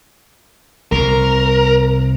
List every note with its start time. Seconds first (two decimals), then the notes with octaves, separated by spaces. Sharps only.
0.92 C2 C3 A#4